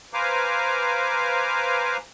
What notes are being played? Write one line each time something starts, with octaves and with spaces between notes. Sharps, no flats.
B4 C5 F5 G#5 A#5 D6